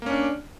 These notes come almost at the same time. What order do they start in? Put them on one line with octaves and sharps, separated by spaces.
A#3 C#4 D4